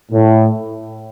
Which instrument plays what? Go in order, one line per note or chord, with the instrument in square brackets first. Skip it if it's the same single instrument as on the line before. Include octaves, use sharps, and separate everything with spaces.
[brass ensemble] A2